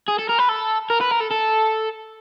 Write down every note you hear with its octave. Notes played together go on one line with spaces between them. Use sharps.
G#4
A4
A#4
B4
A4
A#4
B4
A#4
A4
A4